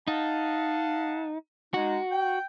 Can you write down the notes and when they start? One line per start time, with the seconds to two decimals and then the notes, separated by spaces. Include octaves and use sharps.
0.07 D#4 F5 F#5 A5
1.74 G#3 D#4 F#4
2.12 G5